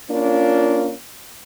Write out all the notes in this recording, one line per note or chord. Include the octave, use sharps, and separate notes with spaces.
A#3 C#4 D4 F4